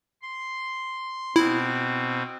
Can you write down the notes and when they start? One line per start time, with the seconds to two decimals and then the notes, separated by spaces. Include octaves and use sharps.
0.23 C6
1.36 B2 C4 E4